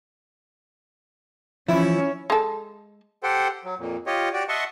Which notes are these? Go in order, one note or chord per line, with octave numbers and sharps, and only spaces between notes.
E3 F3 C#4 E4
G#3 A4
G4 A4 C5 F#5 G5
F#3
F2 A#2
F4 G4 C#5 D#5
F#4 G4 D5
D#5 E5 F#5 A5 C6 C#6